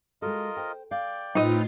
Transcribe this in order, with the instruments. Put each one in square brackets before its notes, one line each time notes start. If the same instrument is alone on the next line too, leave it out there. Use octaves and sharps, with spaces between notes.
[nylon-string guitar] G#3 F#4 A4 [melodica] F4 A#4 D#5
[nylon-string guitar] C5 G5
[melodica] D5 G5 [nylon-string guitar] F5
[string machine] A2 F4 [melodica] C4 B4 [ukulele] D#4 D#5